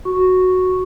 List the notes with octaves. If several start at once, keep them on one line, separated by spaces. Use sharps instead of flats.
F#4 C#6